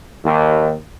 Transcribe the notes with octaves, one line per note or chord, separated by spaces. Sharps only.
D#2